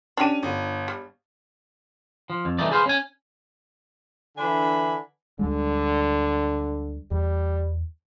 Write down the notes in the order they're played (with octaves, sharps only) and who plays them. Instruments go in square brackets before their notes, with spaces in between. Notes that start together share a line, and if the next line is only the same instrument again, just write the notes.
[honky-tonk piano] C#4 D#7 [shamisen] D4 G4
[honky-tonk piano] G1
[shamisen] G3
[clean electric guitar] F3
F2
C2 E3 A3 D#4 D5
G#4 B4 C5 F5
C#4 G#5
[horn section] D3 E3 D4 G#5 B5
[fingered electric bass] D2 G3 G#3 [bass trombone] D3
[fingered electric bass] E2 [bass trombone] G3